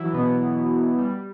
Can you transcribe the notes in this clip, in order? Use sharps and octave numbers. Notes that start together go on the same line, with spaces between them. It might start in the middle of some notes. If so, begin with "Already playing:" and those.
Already playing: E3 F#3 E4
B2 B3
G3